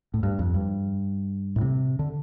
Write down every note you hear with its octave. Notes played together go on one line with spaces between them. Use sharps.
A2
G2
F2
G2
A2
C3
D3